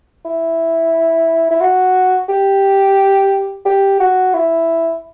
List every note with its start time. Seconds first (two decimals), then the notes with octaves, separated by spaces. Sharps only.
0.25 E4
1.50 E4
1.61 F#4
2.29 G4
3.65 G4
4.00 F#4
4.34 E4